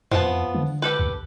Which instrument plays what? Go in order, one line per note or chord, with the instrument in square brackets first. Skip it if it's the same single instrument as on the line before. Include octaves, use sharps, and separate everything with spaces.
[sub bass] F2 [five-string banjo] F3 B3 A5
[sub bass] D3
[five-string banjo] G4 A4 B4
[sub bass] D2